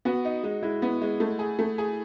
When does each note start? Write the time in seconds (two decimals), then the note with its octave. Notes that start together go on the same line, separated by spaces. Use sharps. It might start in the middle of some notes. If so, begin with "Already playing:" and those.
0.05 B3 F#4
0.25 D#4
0.43 G#3
0.63 G#3 E4
0.82 B3
1.02 G#3
1.20 A3
1.39 G#4
1.59 A3
1.78 G#4